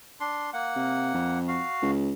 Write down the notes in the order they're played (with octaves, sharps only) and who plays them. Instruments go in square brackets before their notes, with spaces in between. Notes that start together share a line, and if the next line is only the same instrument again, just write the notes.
[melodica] D4 C6
A#3 F#5
[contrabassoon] C3
F2
[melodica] F#4 F5
[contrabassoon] C#2